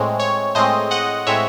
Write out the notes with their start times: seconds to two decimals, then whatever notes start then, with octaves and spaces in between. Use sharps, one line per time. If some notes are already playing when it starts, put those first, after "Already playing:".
Already playing: A2 G#3 C4 C#5
0.20 C#5
0.55 A2 G#3 C4 C5 D#5
0.91 D#5 F#5
1.27 A2 G#3 C4 C#5 E5